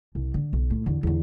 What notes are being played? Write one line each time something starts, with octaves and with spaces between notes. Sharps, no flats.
C2
D3
B1
A2
E2 D3
E2 D3